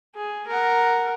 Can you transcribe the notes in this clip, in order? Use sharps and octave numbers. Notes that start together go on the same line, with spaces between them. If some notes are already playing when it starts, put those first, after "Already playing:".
G#4
A#4 F#5